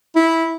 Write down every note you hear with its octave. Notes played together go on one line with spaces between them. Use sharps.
E4